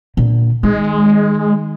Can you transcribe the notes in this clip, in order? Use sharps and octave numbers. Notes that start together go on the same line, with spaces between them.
A#2 D3
D#3 G#3